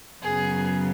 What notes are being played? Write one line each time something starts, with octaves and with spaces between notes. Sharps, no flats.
F#2 C#3 F#3 B3 G#4